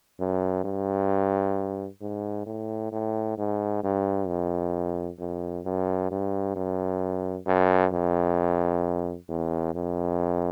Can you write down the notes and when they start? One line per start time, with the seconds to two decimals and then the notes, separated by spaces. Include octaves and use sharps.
0.19 F#2
0.64 G2
2.01 G#2
2.46 A2
2.92 A2
3.38 G#2
3.83 G2
4.28 F2
5.19 F2
5.65 F#2
6.11 G2
6.56 F#2
7.46 F#2
7.92 F2
9.28 E2
9.75 F2